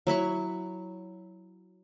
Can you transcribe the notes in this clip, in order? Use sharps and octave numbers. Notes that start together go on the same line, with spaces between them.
F#3 E4 B5 C#6